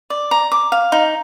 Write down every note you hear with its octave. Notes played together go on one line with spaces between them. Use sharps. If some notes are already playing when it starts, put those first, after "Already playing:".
D5
A#5
D6
F5
D#4